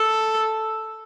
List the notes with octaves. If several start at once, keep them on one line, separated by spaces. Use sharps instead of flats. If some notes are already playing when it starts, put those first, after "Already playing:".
Already playing: A4